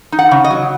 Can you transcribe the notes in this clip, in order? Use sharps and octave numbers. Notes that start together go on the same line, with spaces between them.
D#4
F#5
C#3
D#5
F#3